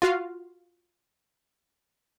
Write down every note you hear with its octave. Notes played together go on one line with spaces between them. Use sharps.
F4 F#4 F5